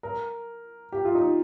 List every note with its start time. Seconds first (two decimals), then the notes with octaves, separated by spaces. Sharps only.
0.03 A#4
0.92 G4
1.05 F4
1.15 D#4